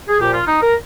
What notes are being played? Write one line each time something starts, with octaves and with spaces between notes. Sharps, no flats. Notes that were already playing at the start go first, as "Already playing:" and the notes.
G#4
A#2 F3 G4
F4
D#4
A#4